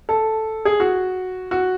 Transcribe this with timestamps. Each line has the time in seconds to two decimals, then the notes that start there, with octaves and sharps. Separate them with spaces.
0.09 A4
0.65 G#4
0.80 F#4
1.51 F#4